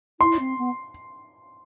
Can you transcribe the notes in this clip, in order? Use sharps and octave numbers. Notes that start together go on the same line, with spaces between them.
E4 C6
C4
B3